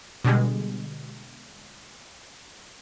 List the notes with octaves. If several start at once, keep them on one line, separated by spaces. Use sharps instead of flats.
B2 D3 G3 G#3